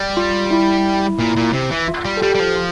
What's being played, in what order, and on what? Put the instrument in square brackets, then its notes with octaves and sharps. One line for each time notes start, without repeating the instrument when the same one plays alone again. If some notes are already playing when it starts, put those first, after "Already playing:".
Already playing: [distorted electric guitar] G3
[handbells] F4
E4
[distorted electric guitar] A#2
A#2
C3
E3
[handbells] F4
[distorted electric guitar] G3
[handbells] A4
[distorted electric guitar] G3 [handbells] G4
[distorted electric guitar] G3
F3
[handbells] F4